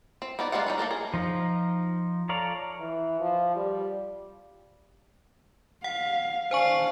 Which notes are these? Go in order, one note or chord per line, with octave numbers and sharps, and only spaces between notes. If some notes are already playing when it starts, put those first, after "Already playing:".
C4
B3 D#4 D5
G3 G#3 A#3 F4 F#5
G3 D#4 C#5
A#3 B3 A4 A#4
G#4
F3 D#4
A4 C#5 D5 F5 A#5
E3
F3
G3
F5 F#5
D4 C5 F5 G#5 C#6